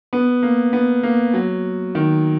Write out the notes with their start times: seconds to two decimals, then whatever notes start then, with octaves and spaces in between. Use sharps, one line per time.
0.13 B3
0.43 A#3
0.73 B3
1.03 A#3
1.34 F#3
1.95 D#3